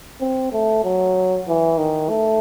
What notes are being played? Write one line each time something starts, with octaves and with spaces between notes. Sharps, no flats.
C4
A3
F#3
E3
D#3
A3